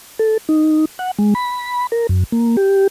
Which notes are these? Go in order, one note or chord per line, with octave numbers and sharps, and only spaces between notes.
A4
D#4
F#5
G#3
B5
A#4
F#2
A#3
G4